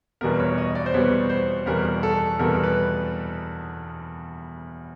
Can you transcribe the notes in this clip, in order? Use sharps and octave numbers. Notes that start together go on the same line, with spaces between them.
E2 B2 G3 B3 A#4
C#5
D#5
D5
C5
E2 B2 G3 B3 C#5
C5
E2 B2 G3 B3 A#4
A4
E2 B2 G3 B3 A#4
B4